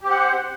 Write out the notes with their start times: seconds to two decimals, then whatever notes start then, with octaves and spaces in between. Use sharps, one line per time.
0.01 G4
0.06 C4
0.10 F#5
0.14 C5